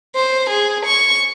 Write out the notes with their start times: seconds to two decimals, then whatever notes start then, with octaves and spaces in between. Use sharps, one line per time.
0.16 C5
0.50 G#4
0.86 C#6